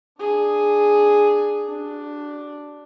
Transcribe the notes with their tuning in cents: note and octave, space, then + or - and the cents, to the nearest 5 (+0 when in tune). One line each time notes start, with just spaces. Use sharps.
D4 +10 G#4 +0
D4 +0 F#4 +35